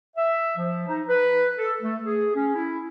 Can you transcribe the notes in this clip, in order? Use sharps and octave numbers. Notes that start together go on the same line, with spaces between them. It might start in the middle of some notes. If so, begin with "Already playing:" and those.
E5
F3
D#4
B4
A4
A3
G#4
C#4
E4